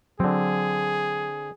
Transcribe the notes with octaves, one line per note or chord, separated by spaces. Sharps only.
D3 F#3 C4 G#4